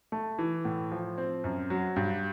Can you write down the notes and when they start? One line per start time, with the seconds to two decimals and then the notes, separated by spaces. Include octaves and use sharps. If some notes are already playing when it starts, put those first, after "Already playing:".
0.12 A3
0.38 E3
0.65 A2
0.92 F3
1.18 C4
1.44 F#2
1.70 F#3
1.96 G2